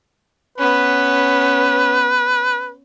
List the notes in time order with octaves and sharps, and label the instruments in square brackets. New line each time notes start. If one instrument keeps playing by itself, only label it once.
[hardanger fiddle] B3 C#4 [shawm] B4